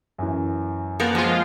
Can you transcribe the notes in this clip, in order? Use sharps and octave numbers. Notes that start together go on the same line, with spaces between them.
F#2 E3
F3 A#3 B3 A#4
F3 G#3 B3 F4